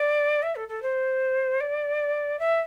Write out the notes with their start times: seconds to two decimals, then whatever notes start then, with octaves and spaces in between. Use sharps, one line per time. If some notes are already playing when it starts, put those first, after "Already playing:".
Already playing: D5
0.42 E5
0.56 A4
0.69 A4
0.82 C5
1.61 D5
2.39 E5